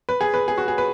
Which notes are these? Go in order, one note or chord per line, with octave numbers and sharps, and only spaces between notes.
B4
G#4
B4
G#4
F#4
G#4
B4